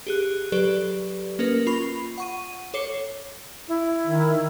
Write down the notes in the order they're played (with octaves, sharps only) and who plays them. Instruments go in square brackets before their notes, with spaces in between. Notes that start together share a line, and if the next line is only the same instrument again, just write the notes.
[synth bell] G4 G#4 F#6
F#3 G4 A4 B4 D5
A#3 C#4 A#4 B4
F4 B5 C#6
F#5 C#6 D#7
A4 C#5 D6 C7 C#7 G7
[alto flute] E4
[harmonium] D#3